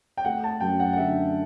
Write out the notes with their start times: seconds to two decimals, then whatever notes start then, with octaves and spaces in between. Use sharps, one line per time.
0.17 G5
0.25 A3 F#5
0.44 A5
0.60 F#2 G5
0.80 F#5
0.93 F#5
0.96 D3 E5